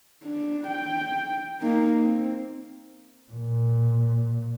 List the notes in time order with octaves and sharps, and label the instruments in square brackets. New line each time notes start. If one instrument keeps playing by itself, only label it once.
[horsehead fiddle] D4
G5
A#3 D#4
C4
[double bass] A#2